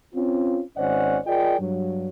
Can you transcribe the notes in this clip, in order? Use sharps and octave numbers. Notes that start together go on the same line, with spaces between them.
C4 C#4 F4
G#1 C#4 C5 D5 D#5 F#5
F4 G#4 A#4 D5 D#5 G5
G2 F#3